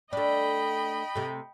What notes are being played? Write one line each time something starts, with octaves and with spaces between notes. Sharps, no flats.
A3 D4 D#5 G5 B5
C3 A3